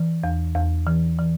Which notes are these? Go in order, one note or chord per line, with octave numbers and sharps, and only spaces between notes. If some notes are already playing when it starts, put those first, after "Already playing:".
Already playing: E3
E2
E2
E3
E3